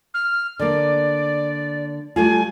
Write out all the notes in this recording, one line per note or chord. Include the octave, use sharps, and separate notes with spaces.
F6
D3 A#3 D5
G3 A3 F4 G#5